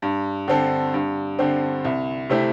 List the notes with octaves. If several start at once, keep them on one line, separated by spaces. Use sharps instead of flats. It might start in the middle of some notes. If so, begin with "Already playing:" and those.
G2
D3 C4 A4
G2
D3 C4
C2
C3 A3 C4 E4